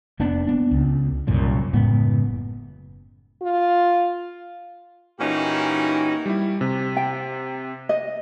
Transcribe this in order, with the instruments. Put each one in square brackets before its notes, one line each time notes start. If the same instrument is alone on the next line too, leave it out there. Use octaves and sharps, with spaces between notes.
[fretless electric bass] F1 A#3 B3 D4
B3 D4
C#2
C2 F#2 A#2
F#1 A2 G#3 B3
[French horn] F4
[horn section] A#2 E3 C#4 D#4 F#4 G4
[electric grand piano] G3 E4
C3
[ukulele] G5
D#5